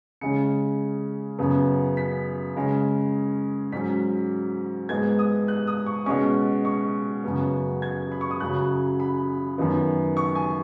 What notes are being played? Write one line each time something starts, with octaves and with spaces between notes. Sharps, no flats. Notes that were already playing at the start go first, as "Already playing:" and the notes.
C#3 G#3 C#4 C#7
F#2 C#3 B3
B6
C#3 G#3 C#4
G#2 F#3 C#4 B6
G#2 G#3 B3 G#6
D#6
F#6
D#6
C#6
B2 G#3 C#4 C#6
C#6
F#2 C#3 B3
G#6
B5
C#6
D#6
F#2 C#3 F#3 F#6
B5
F#2 D#3 B3
C#6
G#5